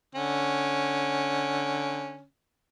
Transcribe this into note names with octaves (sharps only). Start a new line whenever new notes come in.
D3 C#4